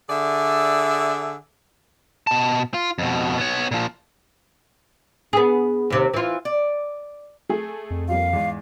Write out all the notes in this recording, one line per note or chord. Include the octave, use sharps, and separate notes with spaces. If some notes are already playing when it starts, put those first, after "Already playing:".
D3 G#4 D5 E5
B2 A5
F4
F2 B2
B3 C#5
A#2 F3
B3 G#4
D#2 C3
E3 F4
D5
A3 G#4
F2
F3 G3 A#3 F5
E2 G#2